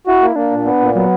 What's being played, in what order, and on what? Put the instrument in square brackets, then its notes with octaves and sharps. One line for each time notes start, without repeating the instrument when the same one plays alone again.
[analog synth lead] E4 [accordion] F#4
[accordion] A#3
[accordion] A#3 [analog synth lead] D4
[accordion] A#2
B3
A#2
[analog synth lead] F#3 [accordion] B3